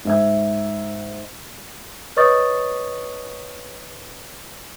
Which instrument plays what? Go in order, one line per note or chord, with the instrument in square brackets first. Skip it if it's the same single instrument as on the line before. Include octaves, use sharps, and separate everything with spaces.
[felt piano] G#2 E5 G#6
[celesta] B4 C#5 D#5 C#6 D#6 A6